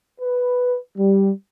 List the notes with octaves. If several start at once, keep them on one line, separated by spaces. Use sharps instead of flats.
B4
G3